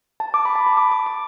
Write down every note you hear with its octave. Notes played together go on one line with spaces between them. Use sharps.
A5
D6
B5
A5
B5
D6
D6
D6